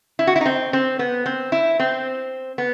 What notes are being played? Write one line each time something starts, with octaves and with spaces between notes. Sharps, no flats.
E4
F#4
E4
D#4
C4
C4
B3
C4
E4
C4
B3